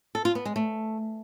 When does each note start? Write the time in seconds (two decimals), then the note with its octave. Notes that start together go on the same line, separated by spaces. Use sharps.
0.15 A4
0.25 F4
0.35 B3
0.45 G#3
0.56 A3